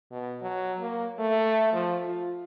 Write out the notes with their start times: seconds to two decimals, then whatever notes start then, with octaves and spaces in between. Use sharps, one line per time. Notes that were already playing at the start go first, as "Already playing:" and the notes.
0.12 B2
0.42 F#3
0.80 A#3
1.19 A3
1.73 F3
2.05 F4